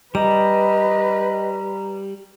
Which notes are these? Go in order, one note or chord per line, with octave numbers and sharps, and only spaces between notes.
G3 B4 D#5 A#5